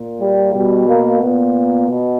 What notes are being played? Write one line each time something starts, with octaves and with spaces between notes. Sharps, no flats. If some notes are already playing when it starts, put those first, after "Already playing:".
Already playing: A#2
G3
B2 G3
A#3
A#2 B3
B2